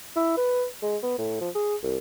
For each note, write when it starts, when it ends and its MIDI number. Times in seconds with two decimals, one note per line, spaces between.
0.16 0.35 64
0.37 0.66 71
0.82 0.97 56
1.03 1.16 59
1.18 1.38 45
1.41 1.49 53
1.55 1.75 68
1.83 1.98 36